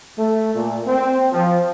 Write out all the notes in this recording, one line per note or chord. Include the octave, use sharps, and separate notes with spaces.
A3
A#2
C4
F3